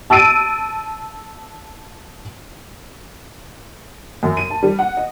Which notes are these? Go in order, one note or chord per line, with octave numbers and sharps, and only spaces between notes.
A5 E6 A6 D7 D#7
F#2
D#7
A5
G3
F#5
D#5